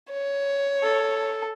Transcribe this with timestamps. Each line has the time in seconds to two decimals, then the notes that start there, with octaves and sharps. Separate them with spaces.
0.12 C#5
0.82 A4